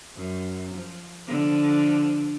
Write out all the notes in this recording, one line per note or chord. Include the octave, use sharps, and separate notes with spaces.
F#2
F3
D3 F3 D4